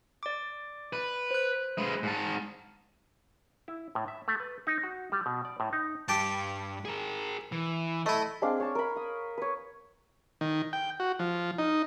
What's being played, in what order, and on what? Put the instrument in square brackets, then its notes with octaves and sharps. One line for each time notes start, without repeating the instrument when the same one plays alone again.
[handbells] D5 D6
[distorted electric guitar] B4
[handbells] C5 F#6
[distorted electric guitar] G#3 B4
G#2 A5
[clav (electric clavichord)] E4
A2
E5
A3
B4
D#4
F#4
G3
B2
D5
A2
D#4
[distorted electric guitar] G2 [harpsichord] G4 G5 A5
[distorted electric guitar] G#4 A#4
E3
[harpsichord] A3 E4 [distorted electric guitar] D#5
[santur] G#3 C4 D4 F5
C#5 A5 C#6
A#4 B5
D#6
B4 C#5
[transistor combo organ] D#3
G5
F#4
F3
D#4